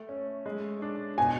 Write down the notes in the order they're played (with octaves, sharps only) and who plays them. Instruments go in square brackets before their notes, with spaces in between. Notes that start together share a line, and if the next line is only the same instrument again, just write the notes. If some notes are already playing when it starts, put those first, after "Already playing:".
Already playing: [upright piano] A3
C#4
G#3
D4
[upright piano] B2 [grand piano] G#5